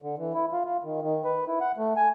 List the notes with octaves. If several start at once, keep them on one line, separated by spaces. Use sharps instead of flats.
D3
E3
E4
F4
F4
D#3
D#3
B4
E4
F#5
A3
G#5